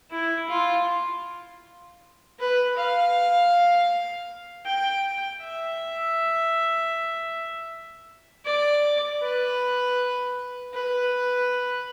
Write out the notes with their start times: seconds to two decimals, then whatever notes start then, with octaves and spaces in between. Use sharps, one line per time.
0.11 E4
0.49 F4
2.39 B4
2.77 F5
4.66 G5
5.42 E5
8.45 D5
9.22 B4
10.74 B4